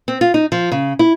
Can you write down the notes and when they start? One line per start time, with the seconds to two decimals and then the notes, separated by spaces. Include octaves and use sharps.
0.08 C4
0.21 F4
0.34 D#4
0.52 F3
0.72 C#3
0.99 E4